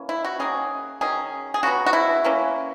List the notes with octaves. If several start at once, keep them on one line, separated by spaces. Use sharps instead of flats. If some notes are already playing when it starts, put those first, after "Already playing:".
Already playing: E3 A#3 C#4
E4
F#4
D#3 A#3 C#4 G#4
D#3 F#3 C#4 G#4
G#4
C#3 F#3 B3 F#4
F#4
E4
E3 A#3 C#4